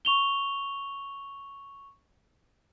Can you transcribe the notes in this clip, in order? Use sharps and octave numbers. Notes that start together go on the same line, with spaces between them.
C#6 F7 G7